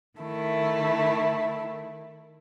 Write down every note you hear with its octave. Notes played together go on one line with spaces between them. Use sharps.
D#3 A3 E4